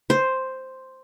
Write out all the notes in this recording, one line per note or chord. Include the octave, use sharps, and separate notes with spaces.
C5